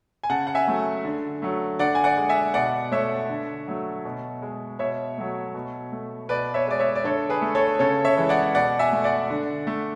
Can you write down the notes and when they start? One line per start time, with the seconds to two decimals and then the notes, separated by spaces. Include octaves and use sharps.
0.23 G#5
0.30 C#3 F#5 A5
0.47 F#5
0.55 E5 G#5
0.67 F#3 A3
1.05 D3
1.42 F#3 A3
1.79 D3 D5 F#5
1.95 G#5
2.04 D5 F#5
2.17 G#3
2.29 E5 G#5
2.54 B2 D5 F#5
2.92 A3 C#5 E5
3.29 D3
3.68 F#3 A3
4.05 B2
4.42 G#3
4.79 B2 C#5 E5
5.18 F#3 A3
5.55 B2
5.92 A3
6.29 B2 B4 D5
6.54 C#5 E5
6.67 G#3 D5
6.80 C#5 E5
6.95 D5
7.04 D3 A4 C#5
7.29 G#4 B4
7.42 A3
7.55 A4 C#5
7.79 C#3 A4 C#5
8.05 C#5 E5
8.17 E3 G#3
8.29 D5 F#5
8.54 B2 D5 F#5
8.79 E5 G#5
8.92 A3
9.04 D5 F#5
9.30 D3
9.67 A3